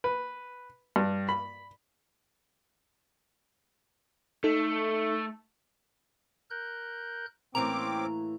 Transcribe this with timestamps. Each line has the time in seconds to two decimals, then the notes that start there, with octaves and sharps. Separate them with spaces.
0.04 B4
0.96 G2
1.29 B5
4.44 A3 D#4 A4
6.50 A#4 F#6 G6
7.55 A2 E3 A#3 C4 C#4 A#5 D6